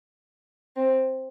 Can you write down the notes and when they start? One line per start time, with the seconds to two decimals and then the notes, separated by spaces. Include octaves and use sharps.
0.76 C4